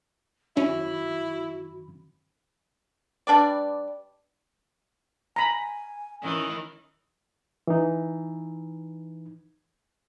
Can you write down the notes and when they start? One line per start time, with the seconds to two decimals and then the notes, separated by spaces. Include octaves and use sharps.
0.57 F#2 D#3 C#4 E4 F#4 B5
3.27 G3 D4 B4 D5
5.36 G#5 A#5 B5
6.22 D#3 E3 C#4
7.67 E3 D#4